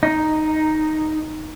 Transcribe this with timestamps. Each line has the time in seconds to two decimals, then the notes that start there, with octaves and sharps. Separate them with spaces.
0.03 D#4